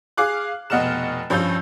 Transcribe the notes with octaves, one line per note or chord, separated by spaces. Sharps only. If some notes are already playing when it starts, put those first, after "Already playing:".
G#4 F5 D6 F#6
F1 B2 D#5 F#5 F6 E7
G2 F3 C#4 F4 E6 G6